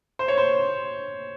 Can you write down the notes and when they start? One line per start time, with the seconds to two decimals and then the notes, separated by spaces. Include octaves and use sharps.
0.19 C5
0.28 C#5
0.38 C5